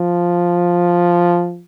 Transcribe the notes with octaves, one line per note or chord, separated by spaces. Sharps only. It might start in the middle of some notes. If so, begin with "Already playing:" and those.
Already playing: F3